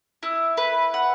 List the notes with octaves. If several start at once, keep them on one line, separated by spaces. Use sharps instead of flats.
E4
B4
F#5